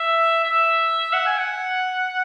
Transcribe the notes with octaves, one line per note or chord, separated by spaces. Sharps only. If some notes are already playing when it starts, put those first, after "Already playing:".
Already playing: E5
E5
F#5
G#5
F#5